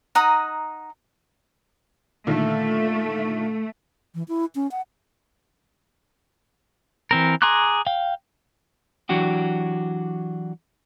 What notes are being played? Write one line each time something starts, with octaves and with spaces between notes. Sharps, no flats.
D#4 F#5 A#5 D#6
A#2 D3 D#3 A3
E3
E4
C#4
F#5
E3 C4 A#4
G#4 A#5 C6 D6 F#6
F5 G5
E3 F#3 D4 F#4 G4